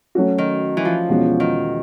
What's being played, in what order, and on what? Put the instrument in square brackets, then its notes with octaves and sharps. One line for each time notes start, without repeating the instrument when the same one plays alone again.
[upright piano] F#3 A3 C#4 F#4
[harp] D#3
E3
F3
[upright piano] E2 B2 G#3 C#4 F#4
[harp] D#3